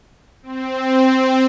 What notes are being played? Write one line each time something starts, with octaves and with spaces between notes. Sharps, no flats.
C4